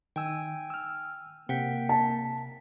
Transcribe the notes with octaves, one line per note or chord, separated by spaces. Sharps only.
D#3 G5 G#5 E6
E6 F6
C3 A#3 F#5 G5 B6
A5 B6